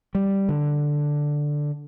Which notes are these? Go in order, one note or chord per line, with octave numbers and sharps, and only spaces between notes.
G3
D3